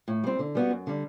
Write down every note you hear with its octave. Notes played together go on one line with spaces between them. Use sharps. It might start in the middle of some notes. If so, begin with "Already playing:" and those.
A2
G3 C4
D3
G3 B3 F#4
F#2
D3 G3